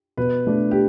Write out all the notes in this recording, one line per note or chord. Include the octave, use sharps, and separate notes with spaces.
B2 B4
A3 D4
G4